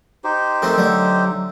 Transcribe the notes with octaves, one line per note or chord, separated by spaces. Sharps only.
D#4 G4 C5
D#3 A3 C4
D3 F#3 A3